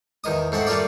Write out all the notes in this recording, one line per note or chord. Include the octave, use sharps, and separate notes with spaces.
E2 D#3 D#5 D#6
G#2 A3 C4 F#5
G3 A3 A#3 F4 D5